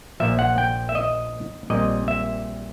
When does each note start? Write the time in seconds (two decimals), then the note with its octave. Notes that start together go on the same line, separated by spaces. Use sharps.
0.20 A#1 A#2 F3 E5
0.39 F#5
0.58 G5
0.89 E5
0.95 D#5
1.70 A#1 A#2 G3 C4 D#5
2.08 E5